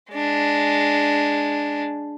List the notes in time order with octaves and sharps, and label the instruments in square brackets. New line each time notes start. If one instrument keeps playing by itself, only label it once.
[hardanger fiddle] G#3 D4